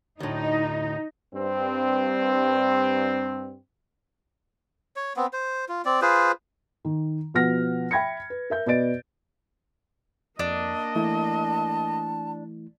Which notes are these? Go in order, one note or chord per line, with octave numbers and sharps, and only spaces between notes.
D2 A2 D#4
G2 C4
C#5
B3 C4
C5
F4
C4 D5
F4 G#4 B4 C5
D#3
B2 F3 B4 F#5 F6 A#6
E5 G5 B5 G#6 A#6 C#7
B4
A#4 E5 G6
B2 B4 D5 D#5 A6 D7
F2 A#3 D4 D#5
E3 A3 E4 A5